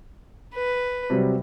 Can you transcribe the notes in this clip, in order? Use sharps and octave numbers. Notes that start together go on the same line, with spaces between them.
B4
C3 F#3 G3